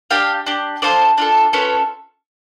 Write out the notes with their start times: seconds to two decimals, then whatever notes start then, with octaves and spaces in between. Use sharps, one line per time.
0.11 D4 G4 F5 G5
0.46 D4 G4
0.82 D4 F4 A4 C5 D5
1.18 D4 F4 A4
1.53 C#4 F4 A4 B4 C#5